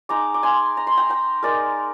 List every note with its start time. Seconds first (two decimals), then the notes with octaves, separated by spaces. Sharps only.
0.09 G#3 D#4 A#5 D6
0.34 D6
0.43 G#5 C6
0.77 A#5
0.87 C6
0.97 G5 A#5
1.09 G5 A#5
1.43 G#3 D#4 A#4 D5